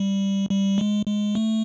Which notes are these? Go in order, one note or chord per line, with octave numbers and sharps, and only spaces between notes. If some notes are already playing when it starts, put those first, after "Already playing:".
Already playing: G3
G3
G#3
G#3
A3